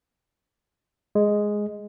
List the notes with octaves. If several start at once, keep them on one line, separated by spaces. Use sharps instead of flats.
G#3